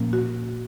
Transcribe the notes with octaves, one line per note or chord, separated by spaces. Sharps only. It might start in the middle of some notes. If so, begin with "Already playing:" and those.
Already playing: A#2 F3 A#3 C#4
F#4